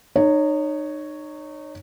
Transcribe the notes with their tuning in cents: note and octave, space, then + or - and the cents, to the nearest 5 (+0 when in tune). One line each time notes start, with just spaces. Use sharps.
D#4 -30 C#5 +0